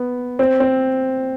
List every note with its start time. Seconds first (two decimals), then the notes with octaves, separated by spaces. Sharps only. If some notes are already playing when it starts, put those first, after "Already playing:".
Already playing: B3
0.39 C4
0.60 C4